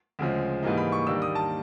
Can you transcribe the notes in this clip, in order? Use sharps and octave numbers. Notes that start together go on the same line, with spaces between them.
D2 C#3 F3 G#3
G#2 E3 G3 A#3 D#4
B5
C#6
D#2 D#3 G3 A#3 D4 E6
D#6
A5